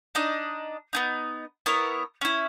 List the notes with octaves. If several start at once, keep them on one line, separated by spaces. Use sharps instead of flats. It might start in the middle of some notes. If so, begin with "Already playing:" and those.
D4 D#4 D#5
B3 C#4 D#4
B3 E4 A#4 C#5
C#4 E4